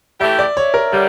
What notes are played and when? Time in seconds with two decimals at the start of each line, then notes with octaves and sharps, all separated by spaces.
0.20 E3 A3 E4 G4 E5
0.39 D5
0.57 C#5
0.74 A#4
0.92 D3 G3 C#5